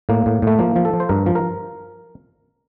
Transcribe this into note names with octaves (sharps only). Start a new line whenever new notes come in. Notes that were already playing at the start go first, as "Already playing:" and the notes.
A2 A#3
A2
A2 A3
F3 A#3
F3
A4
F3
C5
G2 A#4
F3
A#4